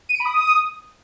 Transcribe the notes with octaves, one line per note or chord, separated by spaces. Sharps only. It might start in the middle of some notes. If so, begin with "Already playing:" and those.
D#7
D7
B5
D#6